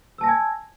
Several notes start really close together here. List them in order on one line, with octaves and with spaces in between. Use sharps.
E6 A5 A#6 G#5 G#6